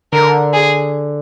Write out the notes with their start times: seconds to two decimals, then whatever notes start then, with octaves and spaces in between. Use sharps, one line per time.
0.13 D3 A#4
0.53 G#4